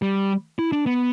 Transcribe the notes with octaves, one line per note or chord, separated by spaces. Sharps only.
G3
E4
D4
B3